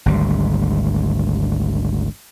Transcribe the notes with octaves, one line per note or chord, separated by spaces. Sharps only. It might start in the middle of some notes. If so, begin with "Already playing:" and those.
G#1 D2 G3